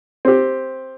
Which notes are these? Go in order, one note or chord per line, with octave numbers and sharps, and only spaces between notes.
C4 G4